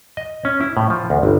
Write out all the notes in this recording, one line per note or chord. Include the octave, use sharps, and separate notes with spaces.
D#5
C#4
E4
A2
F3
D2
G1